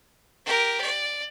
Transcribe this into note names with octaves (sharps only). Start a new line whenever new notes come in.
G4 A#4
D5